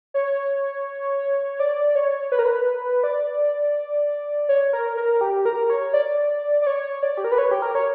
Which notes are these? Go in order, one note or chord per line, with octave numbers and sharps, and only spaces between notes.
C#5
D5
C#5
B4
A#4
B4
D5
C#5
A#4
A#4
G4
A#4
C#5
D5
D5
C#5
D5
G4
A#4
B4
C#5
G4
A#4
C#5